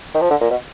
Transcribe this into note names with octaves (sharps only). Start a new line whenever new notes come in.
D#3
F3
D3
A#2
B2